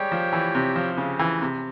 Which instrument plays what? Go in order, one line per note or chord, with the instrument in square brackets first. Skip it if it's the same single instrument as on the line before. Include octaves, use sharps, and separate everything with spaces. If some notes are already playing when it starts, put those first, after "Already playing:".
Already playing: [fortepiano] G3 G#3 [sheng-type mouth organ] G4 C#5 G5
[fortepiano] F3
E3
C3
F3
C#3
E3
C3